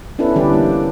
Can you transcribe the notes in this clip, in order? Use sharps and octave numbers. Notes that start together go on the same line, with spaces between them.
B3 C#4 D4 E4 A4 B4
D3 E3 G3 D4 G4 D5
A#3